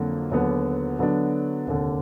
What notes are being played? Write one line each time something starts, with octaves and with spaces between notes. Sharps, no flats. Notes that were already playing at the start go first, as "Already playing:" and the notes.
Already playing: F2 D3 F#3 A#3
D#2 D3 F#3 B3
D3 F#3 B3 D4
F1 D#2 D3